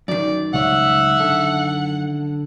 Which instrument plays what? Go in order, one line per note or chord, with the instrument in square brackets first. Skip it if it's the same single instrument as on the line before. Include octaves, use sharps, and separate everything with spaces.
[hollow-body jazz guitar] F#2 D#3 [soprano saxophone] D5
[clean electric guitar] C#2 G3 C#5 [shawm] E5 [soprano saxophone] F#5
[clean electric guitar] D3 A4